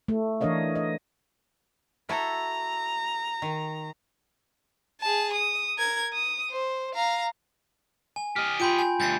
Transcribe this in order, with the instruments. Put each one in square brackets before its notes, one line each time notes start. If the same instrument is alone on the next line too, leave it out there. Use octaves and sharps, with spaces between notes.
[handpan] A3
E3 D4 A#4 C#5 D#5 F5
D#5
[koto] E4 F#4 A4 [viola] A#5
[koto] D#3
[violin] G#4 A5
D#6
A#4 G#6
D#6
C5
F5 A#5
[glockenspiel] G#5
[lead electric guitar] G4 D#5 [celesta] F6
[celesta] F4 G5 C6 [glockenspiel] B5 G6 D7
[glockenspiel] G#5
[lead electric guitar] D2 G2 [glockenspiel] G6 A6 C7